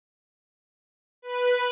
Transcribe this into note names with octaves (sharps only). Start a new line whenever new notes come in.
B4